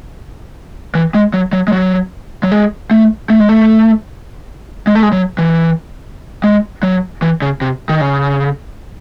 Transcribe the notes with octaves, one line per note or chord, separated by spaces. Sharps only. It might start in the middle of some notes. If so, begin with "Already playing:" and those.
E3
G#3
F#3
F#3
G#3
F#3
F#3
G#3
A3
A3
G#3
A3
G#3
A3
G#3
F#3
E3
G#3
F#3
E3
C#3
C3
D#3
C#3